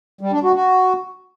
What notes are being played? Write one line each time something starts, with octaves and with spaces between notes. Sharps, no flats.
G3
D4
F#4
F#4